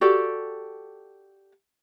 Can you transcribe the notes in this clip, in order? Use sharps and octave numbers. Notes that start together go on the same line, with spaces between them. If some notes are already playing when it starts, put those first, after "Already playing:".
F#4 G4 A4 D5